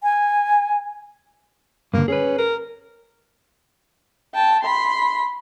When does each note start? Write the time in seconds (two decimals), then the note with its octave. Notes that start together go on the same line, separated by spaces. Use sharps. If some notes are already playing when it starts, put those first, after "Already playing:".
0.03 G#5
1.94 G2 D3 A#3
2.08 C#4 G#4 B4
2.38 A#4
4.35 G5 A5
4.64 B5 C6